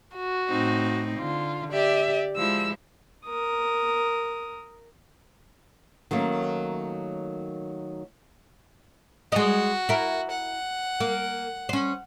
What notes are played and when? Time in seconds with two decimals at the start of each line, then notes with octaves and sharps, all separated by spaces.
0.16 F#4
0.49 A2 C4 D#4
1.19 D3 F4
1.72 G4 D5 E5
2.36 F3 G#3 E4 E6
3.26 A#4 D#6
6.11 D#3 F#3 A3 A#3 C#4
9.32 G#3 F#4 D#5
9.89 E4 A#4
10.31 F#5
11.00 A#3
11.69 C#4 C5